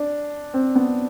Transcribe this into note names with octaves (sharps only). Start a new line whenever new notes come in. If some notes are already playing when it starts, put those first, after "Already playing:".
Already playing: D4
C4
B3